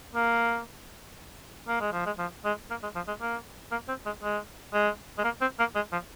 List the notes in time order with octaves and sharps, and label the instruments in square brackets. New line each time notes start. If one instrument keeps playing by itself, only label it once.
[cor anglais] A#3
A#3
G#3
F3
G#3
F3
G#3
A#3
G#3
F3
G#3
A#3
A#3
C4
G#3
G#3
G#3
G#3
A#3
C4
A#3
G#3
F3